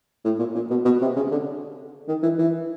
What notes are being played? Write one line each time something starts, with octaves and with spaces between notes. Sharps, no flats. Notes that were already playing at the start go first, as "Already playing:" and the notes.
A2
A#2
A#2
B2
B2
C3
C#3
D3
D#3
E3
E3